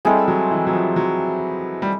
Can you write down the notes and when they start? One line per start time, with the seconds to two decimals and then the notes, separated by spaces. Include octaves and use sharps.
0.05 G3 G#3 C4 E4 A4
0.28 F#3
0.51 E3
0.67 F#3
0.73 F3
0.96 F#3
1.82 G3